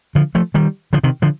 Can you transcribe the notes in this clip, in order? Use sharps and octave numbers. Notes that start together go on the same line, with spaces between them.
D3 F3
F3 A3
D#3 G3
D3 F3
C3 D#3
D3 F3